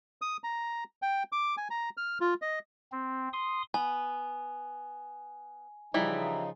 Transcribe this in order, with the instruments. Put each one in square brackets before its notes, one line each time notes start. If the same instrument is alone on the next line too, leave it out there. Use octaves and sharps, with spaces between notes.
[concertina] D#6
A#5
G5
D6
G#5
A#5
F6
F4
D#5
[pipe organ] C4
C6 D#6
[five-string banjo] B3 [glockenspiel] G#5
[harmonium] C#3 F3 D#4 [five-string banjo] E3 G3 E4